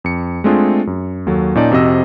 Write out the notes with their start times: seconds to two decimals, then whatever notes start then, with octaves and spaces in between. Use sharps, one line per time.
0.04 F2 C#7
0.44 G#3 A3 C4 D4 F4 G#4
0.87 F#2
1.26 D#2 F#3 A4
1.55 A#2 C#4 D#4 D5 A5
1.71 F2 C3 F#4 D#5 E6